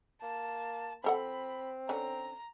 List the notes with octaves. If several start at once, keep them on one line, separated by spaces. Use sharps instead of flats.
A#3 A5
F3 C4 A4 F#5 B5
D3 C#4 A#5